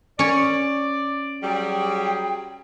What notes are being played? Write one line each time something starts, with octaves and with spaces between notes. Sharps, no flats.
C#4 C#5 D5
F#3 G3 G#4 G5